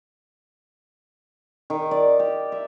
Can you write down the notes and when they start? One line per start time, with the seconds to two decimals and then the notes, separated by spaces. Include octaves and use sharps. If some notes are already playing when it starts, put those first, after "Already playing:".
1.70 D#3
1.91 D5
2.19 G4
2.52 E5